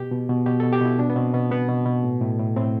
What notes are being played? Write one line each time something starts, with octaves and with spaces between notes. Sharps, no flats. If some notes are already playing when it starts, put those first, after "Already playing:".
Already playing: B2 G4
B2
B2
B2 G4
B2 A4
G4
B2 E4
B2 D4
B3
B2 C4
B2 B3
B2 B3
B2
B2
A2
A2
A2
A2 C4